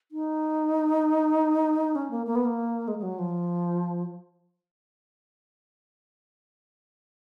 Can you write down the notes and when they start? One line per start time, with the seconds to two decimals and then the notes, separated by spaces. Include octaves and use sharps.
0.12 D#4
1.95 C#4
2.11 A#3
2.26 A#3
2.35 B3
2.45 A#3
2.88 G#3
2.98 G#3
3.03 F#3
3.19 F3